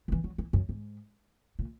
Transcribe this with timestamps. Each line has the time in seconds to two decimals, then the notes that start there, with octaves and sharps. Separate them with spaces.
0.08 D#3
0.12 E3
0.24 F#3
0.38 E3
0.53 F#2
0.69 G#2
1.59 A#2